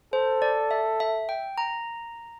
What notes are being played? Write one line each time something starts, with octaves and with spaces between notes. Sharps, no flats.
A4 C5
D5
E5
E5
G5
A#5